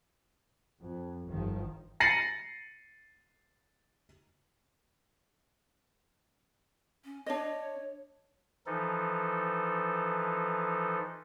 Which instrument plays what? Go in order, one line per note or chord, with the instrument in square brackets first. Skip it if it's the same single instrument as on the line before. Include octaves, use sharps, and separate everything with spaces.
[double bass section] F2
G1 D#3 F3
[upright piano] A6 A#6 C7 C#7 D#7 F#7
[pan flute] C#4
[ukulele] D4 D#5 [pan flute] C#5
[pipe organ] E3 F3 D#4 A4